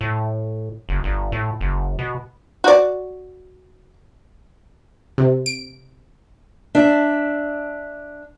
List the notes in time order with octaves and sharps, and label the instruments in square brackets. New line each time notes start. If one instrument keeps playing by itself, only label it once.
[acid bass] A2
F#1
G1
A2
F#1
B2
[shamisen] F#4 D5
[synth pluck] C3
D7
[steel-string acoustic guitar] D4 E5